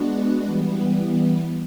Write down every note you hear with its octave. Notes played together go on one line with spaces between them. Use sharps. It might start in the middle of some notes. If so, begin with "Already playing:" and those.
Already playing: G#3 B3 D4 F#4
E3 G3 B3